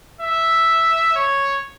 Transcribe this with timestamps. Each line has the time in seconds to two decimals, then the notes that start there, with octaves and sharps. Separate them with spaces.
0.21 E5
1.16 C#5